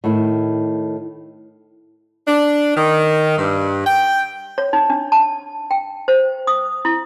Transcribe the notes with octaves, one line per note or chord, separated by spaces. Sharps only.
A2 D#3 E4
D4
D#3
G2
G5
C#5
D#4
D4
A5
G5
C5
D#6
E4